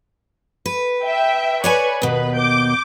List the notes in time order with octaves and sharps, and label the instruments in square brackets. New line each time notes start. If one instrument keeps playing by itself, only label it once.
[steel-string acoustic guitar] B4
[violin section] E5 G5
[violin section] B4 C#6 [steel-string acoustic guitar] C#5 D5 G#5
[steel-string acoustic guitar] D#2 B2 [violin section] B4
[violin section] D6 G6 D7